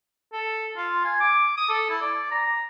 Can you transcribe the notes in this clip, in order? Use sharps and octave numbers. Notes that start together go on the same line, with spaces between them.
A4
F4
G#5
D6
D#6
A4
E4
D5
A#5